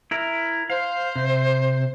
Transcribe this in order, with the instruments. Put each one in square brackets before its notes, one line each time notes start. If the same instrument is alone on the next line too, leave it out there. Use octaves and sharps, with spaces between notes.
[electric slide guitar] E4 A#4
[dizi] C5 [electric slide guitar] F5
[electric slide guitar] C3